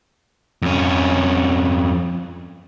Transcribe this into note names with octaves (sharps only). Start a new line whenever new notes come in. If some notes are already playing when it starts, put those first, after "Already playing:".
F2 C#4